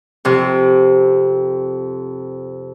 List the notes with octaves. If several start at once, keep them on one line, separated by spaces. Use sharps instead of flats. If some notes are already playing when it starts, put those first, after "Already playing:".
F2 C3